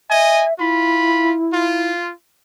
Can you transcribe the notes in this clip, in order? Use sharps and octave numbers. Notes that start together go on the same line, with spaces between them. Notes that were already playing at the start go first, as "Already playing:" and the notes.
D#5 E5 G#5
E4 F4 B5
F4